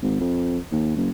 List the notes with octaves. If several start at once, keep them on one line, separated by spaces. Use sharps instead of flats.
G#1
F2
D#2
F#1